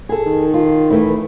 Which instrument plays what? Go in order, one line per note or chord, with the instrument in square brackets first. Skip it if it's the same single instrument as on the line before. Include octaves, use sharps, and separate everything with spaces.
[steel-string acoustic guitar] G#4 A4
[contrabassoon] D#3
[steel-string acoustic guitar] F4
E3 A3 E4